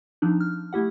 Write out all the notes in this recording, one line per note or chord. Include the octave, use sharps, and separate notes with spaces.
F3 C4 D4 D#4
F6
A3 E4 G4 F#5